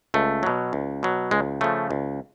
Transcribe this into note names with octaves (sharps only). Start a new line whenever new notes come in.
C#2 A3
B2 F#3
C#2
B2 F#3
C#2 G#3
C#3 F3 A3
C#2